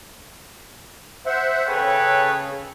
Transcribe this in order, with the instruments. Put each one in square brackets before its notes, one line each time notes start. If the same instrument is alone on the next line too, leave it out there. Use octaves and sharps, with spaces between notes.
[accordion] C5 E5 F#5
[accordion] C#3 [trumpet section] A4 B4 C#5 [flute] G5